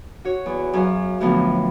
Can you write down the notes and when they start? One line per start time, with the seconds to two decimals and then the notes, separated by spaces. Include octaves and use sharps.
0.25 F#4 C#5
0.46 E2
0.73 F#2 G#4 F5
1.21 F#2 A2 D3 F3 B3